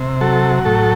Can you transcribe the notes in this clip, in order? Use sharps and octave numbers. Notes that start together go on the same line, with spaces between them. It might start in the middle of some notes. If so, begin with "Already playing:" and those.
Already playing: C3
F#3 A4
A2 A4